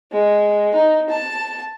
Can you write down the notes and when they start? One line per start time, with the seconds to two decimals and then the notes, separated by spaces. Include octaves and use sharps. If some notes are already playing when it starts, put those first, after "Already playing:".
0.12 G#3
0.74 D#4
1.09 A5